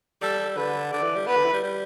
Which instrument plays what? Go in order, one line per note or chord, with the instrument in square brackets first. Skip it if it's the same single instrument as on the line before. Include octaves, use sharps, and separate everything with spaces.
[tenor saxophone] G3 [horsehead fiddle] A4
[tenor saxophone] D3 [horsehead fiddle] B4
[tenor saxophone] D3 [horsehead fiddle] D5
[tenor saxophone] E3
G3
[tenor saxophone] B3 [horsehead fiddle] B4
[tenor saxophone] D3
E3
G3
G3